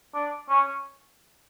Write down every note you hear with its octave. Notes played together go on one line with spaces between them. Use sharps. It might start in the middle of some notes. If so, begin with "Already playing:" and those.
D4
C#4